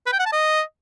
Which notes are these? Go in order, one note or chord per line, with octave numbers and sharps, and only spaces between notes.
B4
G5
F#5
A5
D#5